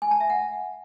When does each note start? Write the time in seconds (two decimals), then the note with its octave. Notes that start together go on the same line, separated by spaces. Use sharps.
0.02 G#5
0.11 A5
0.20 E5
0.30 F#5